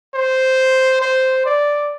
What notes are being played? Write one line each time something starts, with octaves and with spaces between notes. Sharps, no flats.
C5
C5
D5